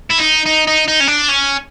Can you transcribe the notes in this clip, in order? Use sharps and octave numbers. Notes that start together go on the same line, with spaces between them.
E4
D#4
D#4
D#4
D#4
C#4
D4
C#4